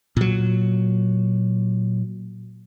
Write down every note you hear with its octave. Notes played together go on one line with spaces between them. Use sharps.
A#2 F#3